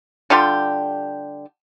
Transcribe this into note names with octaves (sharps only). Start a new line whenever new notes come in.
D3 G3 F4 G4